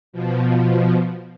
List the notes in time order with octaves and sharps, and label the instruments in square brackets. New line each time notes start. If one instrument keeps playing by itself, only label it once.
[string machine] B2 F3